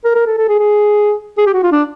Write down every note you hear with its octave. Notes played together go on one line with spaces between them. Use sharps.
A#4
A#4
A4
A4
G#4
G#4
G#4
G4
F#4
F4
D4